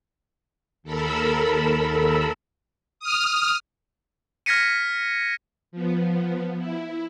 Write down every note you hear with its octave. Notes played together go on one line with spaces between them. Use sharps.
D#2 A4 A#4 B5 E6
D#6 F6
F6 G#6 A#6 B6 C#7 D#7
F3 B3
E4